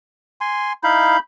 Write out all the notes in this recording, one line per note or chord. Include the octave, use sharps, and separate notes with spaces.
G#5 C6
D#4 E4 F5 B5 G6